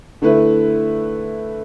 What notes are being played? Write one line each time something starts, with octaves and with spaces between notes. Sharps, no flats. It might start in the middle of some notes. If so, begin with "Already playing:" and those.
D3 A3 E4 B4